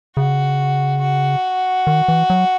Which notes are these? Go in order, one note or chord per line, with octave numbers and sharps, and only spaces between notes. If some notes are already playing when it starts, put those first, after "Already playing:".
C#3 F#4
F#4
D#3
E3
F#3